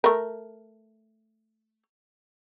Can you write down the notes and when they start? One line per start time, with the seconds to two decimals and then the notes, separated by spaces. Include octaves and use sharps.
0.04 A3 A#4